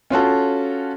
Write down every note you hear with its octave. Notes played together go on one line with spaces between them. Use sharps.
C#4 F4 F#4 A4